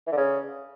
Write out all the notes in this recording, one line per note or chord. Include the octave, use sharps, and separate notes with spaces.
E3
D3
C#3